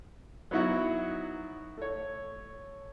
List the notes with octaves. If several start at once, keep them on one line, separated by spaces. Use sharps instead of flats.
F#3 B3 D#4 E4 F#4
A3 C#5